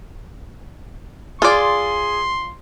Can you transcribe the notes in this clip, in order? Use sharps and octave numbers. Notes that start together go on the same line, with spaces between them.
F4 G#4 D5 C6